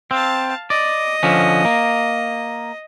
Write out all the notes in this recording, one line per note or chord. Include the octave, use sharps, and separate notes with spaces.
C4 F5 A5
D5 D#5
D3 F3 C#4
A#3